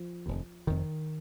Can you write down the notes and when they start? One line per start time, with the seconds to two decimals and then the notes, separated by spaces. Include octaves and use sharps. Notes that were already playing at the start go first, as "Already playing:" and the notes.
Already playing: F3
0.26 F1 D#2
0.67 F1 F2 C3 D#3